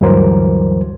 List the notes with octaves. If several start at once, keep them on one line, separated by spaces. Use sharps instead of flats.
D2 G2 E3 F#3 A#4 C5